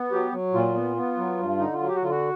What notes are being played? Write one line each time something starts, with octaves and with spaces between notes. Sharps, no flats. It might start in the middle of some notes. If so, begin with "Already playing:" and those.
Already playing: B3
F#3 G4
F#3
A#2 F4
B3
B3
F#3
G2
D3 D#4
F4
F#3
G4
F#4
D3 F4
F#4